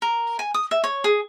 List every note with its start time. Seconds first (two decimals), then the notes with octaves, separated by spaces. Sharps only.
0.02 A#4
0.39 G#5
0.54 D#6
0.71 E5
0.84 C#5
1.04 G#4